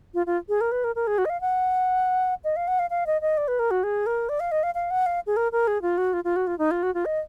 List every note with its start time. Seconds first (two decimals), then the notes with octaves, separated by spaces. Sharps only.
0.14 F4
0.26 F4
0.49 G#4
0.61 A#4
0.72 B4
0.84 A#4
0.96 A#4
1.07 G#4
1.18 F#4
1.25 D#5
1.30 F5
1.41 F#5
2.44 D#5
2.56 F5
2.68 F#5
2.79 F5
2.90 F5
3.07 D#5
3.21 D#5
3.37 D5
3.48 B4
3.59 A#4
3.71 F#4
3.84 G#4
4.06 A#4
4.29 D5
4.40 F5
4.52 D#5
4.63 F5
4.75 F5
4.91 F#5
5.06 F5
5.27 G#4
5.37 A#4
5.52 A#4
5.67 G#4
5.82 F4
5.98 F#4
6.13 F4
6.24 F4
6.36 F#4
6.47 F4
6.59 D#4
6.71 F4
6.83 F#4
6.94 F4
7.05 D#5